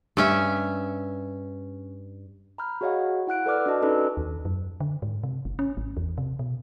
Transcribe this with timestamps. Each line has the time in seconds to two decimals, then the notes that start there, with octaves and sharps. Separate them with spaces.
0.17 G2 C#4 E5
2.58 A#5 B5 F6 G6
2.81 F#4 G#4 C#5 D#5 F5 F#5
3.27 E4 F#5 F#6 D7
3.46 A4 B4 D5 D6 F6
3.66 D4 F#4 D#5 A5
3.82 C#4 D#4 A4 B4 D5
4.17 D#2
4.45 F#2
4.80 D3
5.02 G#2
5.23 C3
5.45 G1
5.59 C#4
5.77 G#1
5.97 E2
6.18 C3
6.39 B2